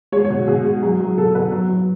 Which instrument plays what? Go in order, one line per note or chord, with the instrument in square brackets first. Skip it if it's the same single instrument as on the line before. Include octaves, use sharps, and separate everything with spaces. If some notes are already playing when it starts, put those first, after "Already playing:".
[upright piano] G#3 C#5
C#5
B2
B2 G#4
G#3
F#3 G#4
F#3
B2 A4
B2 B4
F#3
F#3